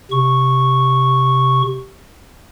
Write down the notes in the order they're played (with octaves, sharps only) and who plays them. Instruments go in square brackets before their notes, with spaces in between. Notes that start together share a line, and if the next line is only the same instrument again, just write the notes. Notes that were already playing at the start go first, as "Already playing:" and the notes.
[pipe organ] C3 C#6